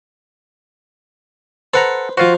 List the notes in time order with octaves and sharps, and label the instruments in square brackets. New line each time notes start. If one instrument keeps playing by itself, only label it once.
[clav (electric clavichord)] A4 F#5 A#5 [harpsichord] B4 C5
[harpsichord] F3 C5 [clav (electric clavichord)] F4 F#4